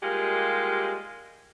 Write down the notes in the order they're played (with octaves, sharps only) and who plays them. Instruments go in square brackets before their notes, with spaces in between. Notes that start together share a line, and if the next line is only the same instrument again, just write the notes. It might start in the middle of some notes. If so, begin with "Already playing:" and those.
[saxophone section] G3 G#3 A#3 D#4 F4 G4